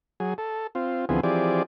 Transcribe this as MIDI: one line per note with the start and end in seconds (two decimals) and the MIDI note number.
0.20 0.34 54
0.20 0.34 68
0.38 0.67 69
0.75 1.05 60
0.75 1.05 65
1.09 1.20 38
1.09 1.20 52
1.09 1.20 53
1.09 1.20 59
1.09 1.20 60
1.09 1.20 68
1.23 1.63 52
1.23 1.63 53
1.23 1.63 60
1.23 1.63 67
1.23 1.63 68
1.23 1.63 74